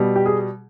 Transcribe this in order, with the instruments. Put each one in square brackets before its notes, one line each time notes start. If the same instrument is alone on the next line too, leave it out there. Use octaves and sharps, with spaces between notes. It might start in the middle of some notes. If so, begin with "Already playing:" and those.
Already playing: [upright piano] B2 G3
G4
G#4